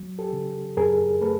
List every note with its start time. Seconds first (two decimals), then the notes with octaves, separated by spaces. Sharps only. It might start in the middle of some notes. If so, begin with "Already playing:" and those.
Already playing: F#3
0.19 G4 A4
0.33 C#3
0.77 F#2 G#4 A#4
1.21 A3 A4 B4